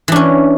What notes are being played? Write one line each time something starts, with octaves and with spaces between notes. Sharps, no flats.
E3 C#4 D4